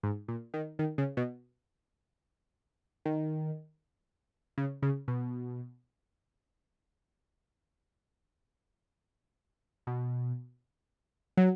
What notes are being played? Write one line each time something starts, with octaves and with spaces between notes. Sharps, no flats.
G#2
A#2
D#3
D#3
C#3
B2
D#3
C#3
C#3
B2
B2
F#3